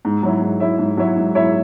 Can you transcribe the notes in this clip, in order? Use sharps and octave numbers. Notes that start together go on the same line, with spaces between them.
G#2
F#3 E4 C#5 E5
G#2
F#3 E4 C#5 E5
G#2
F#3 E4 C#5 E5
G#2
F#3 E4 C#5 E5